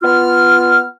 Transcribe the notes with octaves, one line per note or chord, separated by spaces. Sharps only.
B3 F4 F6